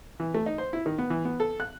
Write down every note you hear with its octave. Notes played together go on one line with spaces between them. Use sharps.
E3
A3
D#4
C5
E4
D#3
B3
E3
B3
A4
F#6